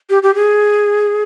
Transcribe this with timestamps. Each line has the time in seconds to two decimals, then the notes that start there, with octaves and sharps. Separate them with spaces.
0.10 G4
0.23 G4
0.35 G#4